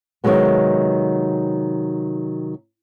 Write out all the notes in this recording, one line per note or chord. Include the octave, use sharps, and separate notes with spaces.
C3 D#3 E3 F#3 G#3 B3